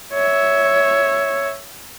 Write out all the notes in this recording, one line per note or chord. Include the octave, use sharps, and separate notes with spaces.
C#5 E5